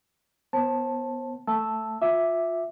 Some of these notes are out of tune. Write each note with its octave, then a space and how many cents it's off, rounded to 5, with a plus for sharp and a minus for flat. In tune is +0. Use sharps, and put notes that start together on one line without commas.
B3 +0 C5 +40 A5 +0
A3 +5 A5 +0 E6 +0
F4 +25 E5 +0 D6 +0